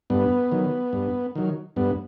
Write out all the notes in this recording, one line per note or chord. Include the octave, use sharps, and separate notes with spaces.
G2 B3
D#3 F#3
G2
D#3 F#3
G2 B3